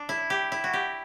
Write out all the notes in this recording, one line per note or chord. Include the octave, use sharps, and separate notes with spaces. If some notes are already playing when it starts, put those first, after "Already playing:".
Already playing: D4
E4
G4
E4
F#4
G4